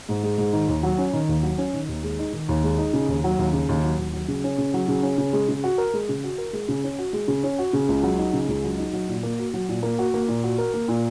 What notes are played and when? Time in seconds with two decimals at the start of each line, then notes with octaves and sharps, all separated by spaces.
0.09 G#2
0.23 G#3
0.38 G#2
0.53 D#3
0.69 D#2
0.83 F#3
0.98 C#4
1.13 D#3
1.29 D#2
1.43 F#3
1.58 C#4
1.74 D#3
1.89 D#2
2.03 G#3
2.19 D#4
2.33 D#3
2.49 D#2
2.64 G#3
2.78 D#4
2.93 C#3
3.08 D#2
3.24 F#3
3.39 D#2
3.53 C#3
3.69 D#2
3.83 F#3
3.98 D#2
4.13 F#3
4.28 C#3
4.44 C#4
4.58 C#3
4.74 F#3
4.88 C#3
5.03 C#4
5.18 C#3
5.33 G#3
5.49 C#3
5.64 F#4
5.78 A#4
5.94 G#3
6.09 C#3
6.24 F#4
6.38 A#4
6.53 G#3
6.69 C#3
6.84 C#4
6.99 F#4
7.13 G#3
7.28 C#3
7.43 C#4
7.59 F#4
7.73 C#3
7.88 C#2
8.03 F#3
8.18 D#4
8.33 C#3
8.48 C#2
8.63 F#3
8.78 D#4
8.93 F#3
9.08 A#2
9.23 A#3
9.38 F#4
9.54 F#3
9.69 A#2
9.83 A#3
9.99 F#4
10.14 A#3
10.28 A#2
10.44 F#4
10.58 A#4
10.73 A#3
10.88 A#2